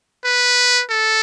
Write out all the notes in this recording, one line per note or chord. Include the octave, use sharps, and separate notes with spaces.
B4
A4